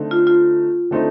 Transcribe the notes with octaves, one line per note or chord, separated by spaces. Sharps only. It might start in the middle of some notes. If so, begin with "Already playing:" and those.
Already playing: D3 A3 C4 D#4
F4
F4
D3 A3 C4 D#4